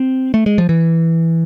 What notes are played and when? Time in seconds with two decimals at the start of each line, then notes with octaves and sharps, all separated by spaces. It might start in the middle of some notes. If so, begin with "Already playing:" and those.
Already playing: C4
0.34 A3
0.46 G#3
0.58 F3
0.69 E3